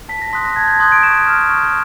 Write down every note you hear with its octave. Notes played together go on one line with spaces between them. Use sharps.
A5 B6
A#6
C6 D#6 F#6 B6
A#6
A5 G#6
G6
C6 D#6 F#6 G#6
D7
C#6 E7
F6
C#6